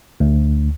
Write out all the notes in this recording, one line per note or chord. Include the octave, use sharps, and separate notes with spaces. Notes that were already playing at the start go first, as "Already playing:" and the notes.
D2